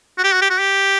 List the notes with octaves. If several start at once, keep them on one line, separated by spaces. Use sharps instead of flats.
F#4
G4
F#4
G4
F#4
G4